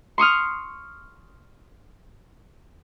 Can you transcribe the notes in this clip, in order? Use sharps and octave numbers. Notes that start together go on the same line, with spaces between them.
C6 C#6 D#6 F6